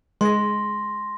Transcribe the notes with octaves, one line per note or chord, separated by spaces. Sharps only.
G#3 C6 A#6